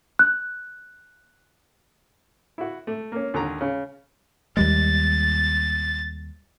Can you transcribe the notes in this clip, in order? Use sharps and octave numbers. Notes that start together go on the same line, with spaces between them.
F#6
E4 F#4
A3
A#3 C#4
D#2 D3 A#5
C#3
D#2 G3 G#3 A6